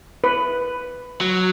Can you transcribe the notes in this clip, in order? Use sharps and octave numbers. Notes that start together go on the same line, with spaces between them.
B4
F#3